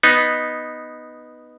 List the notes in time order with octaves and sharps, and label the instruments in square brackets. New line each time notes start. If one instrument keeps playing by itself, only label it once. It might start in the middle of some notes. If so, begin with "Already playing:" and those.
[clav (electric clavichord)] B3 D#4